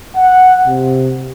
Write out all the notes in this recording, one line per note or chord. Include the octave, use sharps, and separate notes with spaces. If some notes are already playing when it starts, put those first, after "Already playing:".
F#5
C3